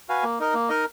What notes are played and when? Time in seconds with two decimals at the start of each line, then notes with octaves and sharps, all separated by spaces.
0.09 F#4 B4 F5 G#5
0.23 A#3
0.40 D#4 A#4 D#5
0.54 A#3
0.69 D#4 A#4 D#5